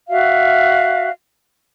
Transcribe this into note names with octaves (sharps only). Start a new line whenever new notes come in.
F#4 E5 F5